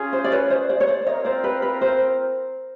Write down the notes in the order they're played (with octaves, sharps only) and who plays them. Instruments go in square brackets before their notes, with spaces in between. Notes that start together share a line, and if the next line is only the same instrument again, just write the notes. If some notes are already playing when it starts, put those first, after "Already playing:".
Already playing: [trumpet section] C#4 F4 G#4
[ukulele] C5
D5
B4 C#5
C5 D5
C5 D5
C#5
C5 D5
[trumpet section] C4 F4 A#4 [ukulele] C#5 D#5
[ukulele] C5 D5
B4
B4
C5